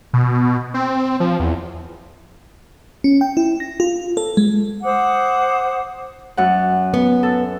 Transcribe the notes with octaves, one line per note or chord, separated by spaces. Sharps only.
B2
C4
F3
E2
C#4
G5
E4
A#6
F4
A4
G#3
C5 F#5 D6 D#6
F#2 F#5
B3
A4